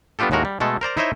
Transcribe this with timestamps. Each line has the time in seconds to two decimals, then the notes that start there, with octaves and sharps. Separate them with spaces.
0.19 G3 B3 D4 F4 G4 A4
0.31 D#2 A2 G#3 F#4 A#4
0.45 G3
0.60 B2 G#3 A3 A4
0.81 A#4 C5 D5 A#5
0.97 D#4 E4 C5 C#5 D#5 E5